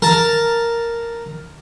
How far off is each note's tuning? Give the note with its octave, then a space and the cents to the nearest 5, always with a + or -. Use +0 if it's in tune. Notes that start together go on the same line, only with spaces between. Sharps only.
A#4 +0 A5 +5